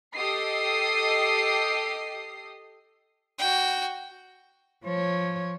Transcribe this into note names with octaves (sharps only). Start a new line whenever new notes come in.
G4 A4 D#5 D#6 C7
F#4 G5
F3 C#5